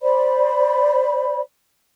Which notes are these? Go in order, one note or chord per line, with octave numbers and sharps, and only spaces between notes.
C5 D5 B5